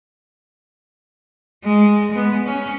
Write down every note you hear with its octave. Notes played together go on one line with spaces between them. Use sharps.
G#3
G#3 B3
C#4